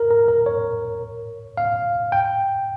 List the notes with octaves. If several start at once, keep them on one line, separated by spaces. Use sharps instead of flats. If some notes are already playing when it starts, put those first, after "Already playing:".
Already playing: A#4
A#4
A#4
C#5
F5
G5